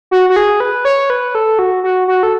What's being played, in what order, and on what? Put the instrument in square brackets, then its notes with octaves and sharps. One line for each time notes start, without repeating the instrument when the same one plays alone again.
[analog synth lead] F#4
F#4
G#4
B4
C#5
B4
A4
F#4
F#4
F#4
A4